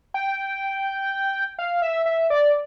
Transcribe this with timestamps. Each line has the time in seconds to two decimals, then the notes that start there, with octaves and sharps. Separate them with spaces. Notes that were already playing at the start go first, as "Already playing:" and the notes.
0.14 G5
1.59 F5
1.82 E5
2.06 E5
2.30 D5